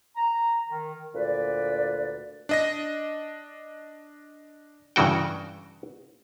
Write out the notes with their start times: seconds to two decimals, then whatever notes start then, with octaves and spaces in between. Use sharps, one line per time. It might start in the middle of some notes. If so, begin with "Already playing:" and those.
0.16 A#5
0.67 D#3
1.14 D2 A#2 B4 D5
2.49 D4 D#5 A#6
4.96 G2 C#3 E3 F#4 G5